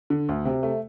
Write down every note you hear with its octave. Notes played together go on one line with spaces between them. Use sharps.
D3
D2
C3
A3